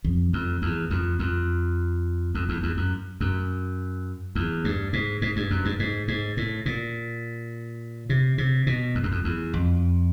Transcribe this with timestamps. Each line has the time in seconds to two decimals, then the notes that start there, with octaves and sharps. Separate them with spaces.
0.04 F2
0.33 F2
0.62 E2
0.90 F2
1.19 F2
2.35 F2
2.49 E2
2.63 E2
2.77 F#2
3.21 F#2
4.35 E2
4.65 G2
4.93 G#2
5.22 G#2
5.36 G2
5.50 F#2
5.65 G2
5.79 G#2
6.08 G#2
6.37 A2
6.66 A#2
8.09 C3
8.38 C3
8.67 B2
8.95 F2
9.03 F#2
9.12 F2
9.24 E2
9.54 F2